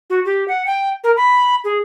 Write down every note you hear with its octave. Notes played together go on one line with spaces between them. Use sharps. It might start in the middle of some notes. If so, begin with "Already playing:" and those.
F#4
G4
F#5
G5
A#4
B5
G#4